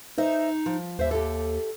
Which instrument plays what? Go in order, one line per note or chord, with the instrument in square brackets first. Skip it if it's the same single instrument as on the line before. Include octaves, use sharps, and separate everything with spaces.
[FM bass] D#4 [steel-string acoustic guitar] C5 D#5 E5
[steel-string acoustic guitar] F3
[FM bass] D#2 [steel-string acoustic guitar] C5 E5
[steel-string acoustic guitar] G4 A4